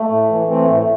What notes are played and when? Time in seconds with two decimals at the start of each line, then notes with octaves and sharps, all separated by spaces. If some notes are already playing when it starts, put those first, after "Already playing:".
Already playing: A3
0.10 A2
0.30 E3
0.48 E3 A3 C4
0.67 A2 A3